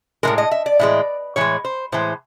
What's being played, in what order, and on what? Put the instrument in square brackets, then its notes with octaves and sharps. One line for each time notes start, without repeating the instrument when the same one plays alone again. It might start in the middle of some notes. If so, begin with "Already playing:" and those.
[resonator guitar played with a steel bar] E3 G#3 A#4
A2
D#5
E5
D5
A2 E3 G#3
A2 E3 G#3 C#5
C5
A2 E3 G#3 C5